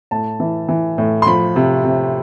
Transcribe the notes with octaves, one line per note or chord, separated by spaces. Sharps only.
A2 A5
E3
E3
A2
C6
F3 B5
C3
C3